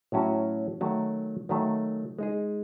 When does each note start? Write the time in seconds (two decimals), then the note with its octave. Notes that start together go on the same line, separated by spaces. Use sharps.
0.12 A2 F#3 C#4 F#4
0.81 D#3 F#3 A3
1.49 D#3 F#3 A3
2.19 G#3 D#4 G#4